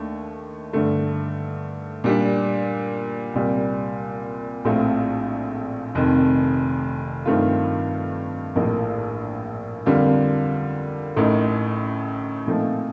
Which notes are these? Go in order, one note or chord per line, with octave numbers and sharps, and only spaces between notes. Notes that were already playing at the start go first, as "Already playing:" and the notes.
Already playing: D#2 D#3 A3 D4
G2 D3 A3
A#2 G3 D4
C2 A#2 G3
A#1 A2 A3 C4 F4
F1 F2 D#3
G2 D#3 A3 C4 F4
A#1 A2 F3 A#3
F2 D3 G3 A#3 F4
A1 A2 A3 D#4 A#4
A#2 F3 A3 C4 D#4